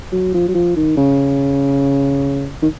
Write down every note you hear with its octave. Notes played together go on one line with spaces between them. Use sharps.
F#3
F3
F#3
F3
D#3
C#3
D#3